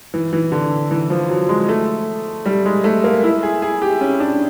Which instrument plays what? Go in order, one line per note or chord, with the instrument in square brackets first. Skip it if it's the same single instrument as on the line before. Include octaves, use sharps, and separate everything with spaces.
[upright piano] E3
E3
D3
E3
F3
F#3
G#3
A3
G3
G#3
A3
A#3
E4
G#4
G#4
G4
C#4
D4